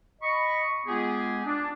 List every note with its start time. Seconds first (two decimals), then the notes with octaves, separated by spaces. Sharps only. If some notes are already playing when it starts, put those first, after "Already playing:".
0.22 D#5 B5 C#6
0.86 G#3 B3 F4 G4 G#4
1.45 D4